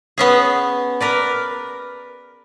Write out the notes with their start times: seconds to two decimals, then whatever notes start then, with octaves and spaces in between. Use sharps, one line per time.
0.18 B3 C#4 G#4
1.01 A#4 B4 D5